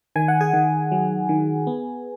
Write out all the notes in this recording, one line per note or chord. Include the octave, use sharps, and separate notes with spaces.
D#3 G#5
F#5
G#4 G#5
D#3
F#3
D#3
B3